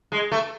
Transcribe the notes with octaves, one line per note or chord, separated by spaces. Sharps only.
G#3
A3